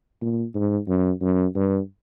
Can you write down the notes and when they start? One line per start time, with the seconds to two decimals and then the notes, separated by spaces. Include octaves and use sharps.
0.22 A#2
0.55 G#2
0.88 F#2
1.22 F#2
1.55 G2